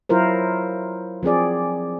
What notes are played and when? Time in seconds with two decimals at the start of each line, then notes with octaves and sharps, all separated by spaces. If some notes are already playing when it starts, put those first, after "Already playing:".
0.09 F#3 E4 F4 A#4 C5
1.23 F3 C4 G#4 D5